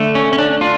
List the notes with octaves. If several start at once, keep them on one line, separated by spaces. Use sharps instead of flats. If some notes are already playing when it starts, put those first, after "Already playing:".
Already playing: D3 A3
C#4
C#4
D4
D4 F4